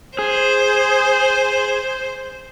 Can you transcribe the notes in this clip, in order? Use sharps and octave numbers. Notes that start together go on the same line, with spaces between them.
G#4 C5